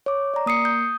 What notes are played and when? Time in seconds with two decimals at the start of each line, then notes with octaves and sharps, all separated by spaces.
0.06 C#5 D6
0.34 D5 A#5
0.46 A#3 D#6 C7 C#7
0.65 D#6 G6